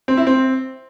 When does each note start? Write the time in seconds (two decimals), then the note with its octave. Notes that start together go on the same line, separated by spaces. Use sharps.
0.08 C4
0.17 E4
0.27 C4